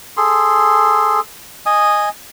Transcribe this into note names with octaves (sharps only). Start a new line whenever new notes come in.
G#4 A4 C6
D#5 G#5 D#6